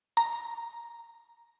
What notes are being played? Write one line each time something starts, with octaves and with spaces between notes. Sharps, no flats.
A#5